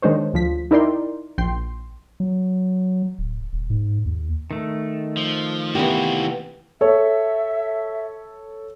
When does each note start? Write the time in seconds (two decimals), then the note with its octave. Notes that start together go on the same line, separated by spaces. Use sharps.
0.02 D#3 G#3 D4 C5 C#5
0.34 D2 F3 B6
0.71 D#4 E4 A#4 D5 G5 C6
1.38 A#1 G5 C6 C7
2.20 F#3
3.19 D1
3.53 D#1
3.70 G#2
4.06 D#2
4.51 D#3 A3
5.17 F3
5.75 C3 E3 A#3 B3 F#4 G4
6.81 A4 C#5 E5